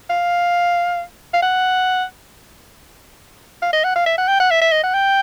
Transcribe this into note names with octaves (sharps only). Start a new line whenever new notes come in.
F5
F5
F#5
F5
D#5
F#5
F5
E5
F#5
G5
F#5
E5
E5
D#5
F#5
G5